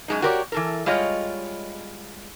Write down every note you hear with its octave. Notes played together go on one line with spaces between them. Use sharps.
F#2 G#3 D#4
F#4 G4 A#4 C#5 D5
E3 A4 A#4
G3 G#3 F4 C#5 D#5